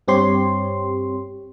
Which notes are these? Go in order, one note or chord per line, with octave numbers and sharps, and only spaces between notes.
G2 C4 G4 C#5 C6